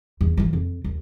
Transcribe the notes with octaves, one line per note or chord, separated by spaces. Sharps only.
E2
E3 F3
F2
D#2